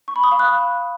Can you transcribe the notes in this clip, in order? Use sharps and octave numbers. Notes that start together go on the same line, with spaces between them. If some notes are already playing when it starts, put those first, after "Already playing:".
C#6
B5
D#6
F5
F#6